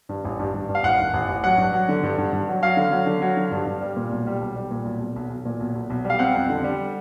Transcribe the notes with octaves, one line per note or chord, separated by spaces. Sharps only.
G2
A1
G2
G2
G2
F5
A1 F#5
D#3
A1
A1
F#3 F#5
G2
F#3
D3
G2
G2
G2
F#3
F#3 F5
D3
F#3
D3
F#3
D3
G2
G2
G3
A#2
B1
G3
B1
G3
A#2
B1
B1
B1
B1
A#2
B1
B1
B1
G3
F5
C4 F#5
F2
D3
G3